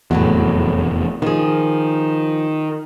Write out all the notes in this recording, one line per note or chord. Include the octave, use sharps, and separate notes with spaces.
F1 E2 A2 F#3 F#4
D#3 F3 G#4